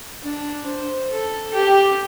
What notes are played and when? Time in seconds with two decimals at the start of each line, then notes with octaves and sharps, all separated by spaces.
0.22 D4
0.66 C5
1.10 A4
1.54 G4